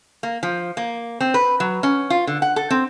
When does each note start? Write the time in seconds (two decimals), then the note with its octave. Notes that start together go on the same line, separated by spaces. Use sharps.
0.23 A#3
0.43 F3
0.77 A#3
1.20 C4
1.34 B4
1.60 F#3
1.83 C#4
2.10 F4
2.27 D3
2.42 F#5
2.56 A4
2.70 C4